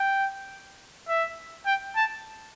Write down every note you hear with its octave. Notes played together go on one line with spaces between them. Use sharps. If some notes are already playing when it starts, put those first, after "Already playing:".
Already playing: G5
E5
G5
A5